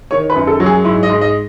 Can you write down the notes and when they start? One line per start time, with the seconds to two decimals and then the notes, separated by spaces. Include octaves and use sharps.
0.11 D#3 C#5
0.30 B4
0.35 F#2
0.47 A4
0.60 F#3
0.66 G#4
0.85 G#2 E4
1.03 D#5
1.10 G#2
1.21 D#5